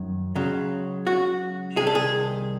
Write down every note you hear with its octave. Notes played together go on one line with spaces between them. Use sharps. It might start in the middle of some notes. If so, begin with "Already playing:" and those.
Already playing: F#2 D#3 F#3
C#2 C#3 F#3
F#4
C2 C3 D#3 G#4
A4
G#4